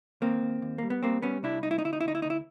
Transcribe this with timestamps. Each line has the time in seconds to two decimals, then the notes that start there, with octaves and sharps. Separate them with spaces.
0.21 D#2 A#3 C4
0.42 D#2
0.62 D#2
0.78 G3 A#3
0.90 B3
1.03 G3 A#3 C4
1.22 G3 B3 C#4
1.43 C2 D4 E4
1.63 C2 D#4
1.71 E4
1.79 D#4
1.84 D2 E4
1.93 D#4
2.01 E4
2.05 D2 D#4
2.15 E4
2.22 D2 D#4
2.30 E4